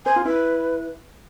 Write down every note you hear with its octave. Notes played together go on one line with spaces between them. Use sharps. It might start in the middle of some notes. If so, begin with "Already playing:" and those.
C5 G#5
F4
E4 B4